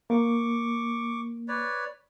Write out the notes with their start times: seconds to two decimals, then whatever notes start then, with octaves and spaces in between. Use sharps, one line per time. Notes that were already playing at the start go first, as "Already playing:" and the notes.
0.10 A#3 C#6 D6
1.48 B4 C#5 D5